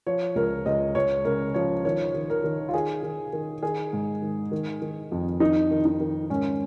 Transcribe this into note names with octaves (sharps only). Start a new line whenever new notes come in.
F3 C#5
C#2 A#4
C#2 D#5
C#2 C#5
C#3 A#4
F3 C#5
D#3 C#5
D#3
A#4
D#3
F4
D#3 G#4
D#3
D#3
D#3 G#4
G#2
D#3
D#3
D#3
F2
D#3 D#4
D#3
D#4
D#3
G#2 C#4